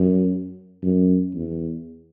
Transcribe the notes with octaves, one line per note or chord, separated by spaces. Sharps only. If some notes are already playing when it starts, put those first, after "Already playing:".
Already playing: F#2
F#2
E2